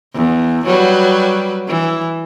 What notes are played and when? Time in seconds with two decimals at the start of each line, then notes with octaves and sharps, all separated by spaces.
0.15 E2
0.66 F#3 G3 B4
1.68 E3